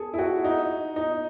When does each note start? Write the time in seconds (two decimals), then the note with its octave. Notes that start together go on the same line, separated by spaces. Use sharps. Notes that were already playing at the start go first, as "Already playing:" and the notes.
Already playing: G#4 A4
0.14 E4
0.19 F#4
0.44 D#4
0.96 D#4